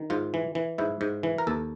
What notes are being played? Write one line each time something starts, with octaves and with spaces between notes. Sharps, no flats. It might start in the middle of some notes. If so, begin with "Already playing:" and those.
Already playing: D#3
G#2 F4
E3
E3
G#2 E4
G#2
E3
A#4
D#2 A4